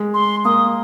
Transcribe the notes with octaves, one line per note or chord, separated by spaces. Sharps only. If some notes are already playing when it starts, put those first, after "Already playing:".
Already playing: G#3
C6
A#3 D#6